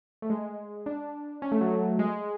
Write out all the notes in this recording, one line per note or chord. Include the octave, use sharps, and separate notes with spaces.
A3
G#3
D4
C#4
A3
F#3
G#3